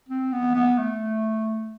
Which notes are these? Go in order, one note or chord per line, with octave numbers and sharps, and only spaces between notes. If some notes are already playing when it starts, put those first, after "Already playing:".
C4
B3
B3
A3